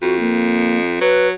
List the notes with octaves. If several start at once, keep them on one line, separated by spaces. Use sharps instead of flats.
F2 F#4
A#3
F#3 B4